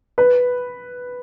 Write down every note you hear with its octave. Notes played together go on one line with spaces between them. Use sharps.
B4